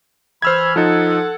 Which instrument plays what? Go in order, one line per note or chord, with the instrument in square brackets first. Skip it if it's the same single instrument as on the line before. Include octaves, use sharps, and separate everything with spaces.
[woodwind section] E3 B5 F6 [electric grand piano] C5 E6 G#6
[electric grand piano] F3 D#4 [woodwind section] A4 F#5